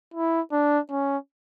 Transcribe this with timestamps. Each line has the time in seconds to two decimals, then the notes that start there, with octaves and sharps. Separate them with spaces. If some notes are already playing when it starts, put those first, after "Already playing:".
0.14 E4
0.52 D4
0.90 C#4